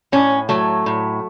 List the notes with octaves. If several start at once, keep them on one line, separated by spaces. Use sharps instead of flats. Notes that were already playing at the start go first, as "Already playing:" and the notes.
A2 C#4
F#3 A3
A2